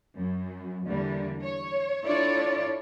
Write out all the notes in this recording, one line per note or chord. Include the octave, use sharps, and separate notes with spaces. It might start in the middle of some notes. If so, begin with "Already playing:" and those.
F#2
E2 D3 E3 G3 A#3
C#5
D4 E4 F4 A4 C#5 D5